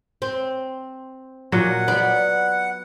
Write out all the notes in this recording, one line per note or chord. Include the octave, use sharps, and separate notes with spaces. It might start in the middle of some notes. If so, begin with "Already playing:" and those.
C4
A#2 F#3 D#5 F#5
B3 B4 D5